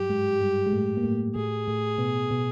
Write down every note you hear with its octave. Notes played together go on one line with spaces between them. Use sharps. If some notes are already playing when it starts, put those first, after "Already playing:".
Already playing: G2 F#3 G3 G4
G#2 G#3
G2 G3
G#3
A2 A3
A#3
A2 A3
A2 A3 G#4
A2 A3
B2 B3
B2 B3